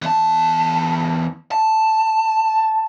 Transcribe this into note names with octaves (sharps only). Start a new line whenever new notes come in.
E2 A5
A5